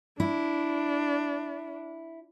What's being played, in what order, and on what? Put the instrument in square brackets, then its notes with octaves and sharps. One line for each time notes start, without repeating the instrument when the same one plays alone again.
[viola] D4 [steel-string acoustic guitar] E4